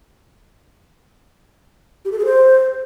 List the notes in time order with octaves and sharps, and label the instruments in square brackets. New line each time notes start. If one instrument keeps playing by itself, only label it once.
[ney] G4
A4
G#4
C5